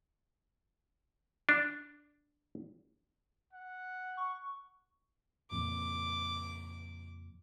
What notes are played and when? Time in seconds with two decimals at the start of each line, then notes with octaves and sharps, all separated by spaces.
1.49 D4
3.54 F#5
4.17 C#6
5.51 F2 A#2 C#3 D6